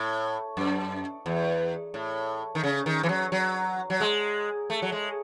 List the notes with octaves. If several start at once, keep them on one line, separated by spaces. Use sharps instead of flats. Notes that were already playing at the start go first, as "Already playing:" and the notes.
Already playing: A2
F#2
E2
A2
D#3
C#3
D#3
E3
F#3
F#3
F#3
G#3
A3
F#3
G#3